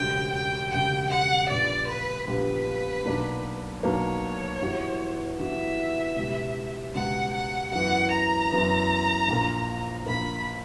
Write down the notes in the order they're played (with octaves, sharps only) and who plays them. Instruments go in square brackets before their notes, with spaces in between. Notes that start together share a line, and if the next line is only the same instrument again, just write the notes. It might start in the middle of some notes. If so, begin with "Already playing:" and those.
Already playing: [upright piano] E1 D2 C#3 G3 [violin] G5
[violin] G5
[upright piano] E1 D2 C#3 G3 [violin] G5
[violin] F#5
[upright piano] A#1 A#2 G3 B3 [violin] D5
[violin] B4
[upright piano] A#1 A#2 G3 B3 [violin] B4
[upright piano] B1 B2 A#3 D4
[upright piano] B1 B2 A#3 D4 [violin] C#5
[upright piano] G2 E3 B3 F#4
[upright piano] G2 E3 B3 F#4 [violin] E5
[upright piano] C#2 B2 G3
[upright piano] C#2 B2 G3 [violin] F#5
[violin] F#5
[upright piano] F#2 E3 B3 [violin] F#5
[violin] A#5
[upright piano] F#2 E3 B3
A#1 A#2 A#3
[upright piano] A#1 A#2 A#3 [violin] B5